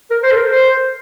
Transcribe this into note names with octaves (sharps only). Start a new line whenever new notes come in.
A#4
C5
A4
A#4
C5